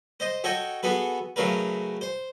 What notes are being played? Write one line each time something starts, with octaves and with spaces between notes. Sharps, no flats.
C5 D#5
F#4 A4 C#5 D#5 G5
B3 F#4 G#4 A4 B4
C#3 F#3 A3 A#4 B4
C5